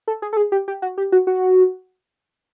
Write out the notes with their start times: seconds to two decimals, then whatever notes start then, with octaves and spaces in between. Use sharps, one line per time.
0.08 A4
0.22 G#4
0.33 A4
0.37 G#4
0.52 G4
0.68 G4
0.82 F#4
0.98 G4
1.12 F#4
1.27 F#4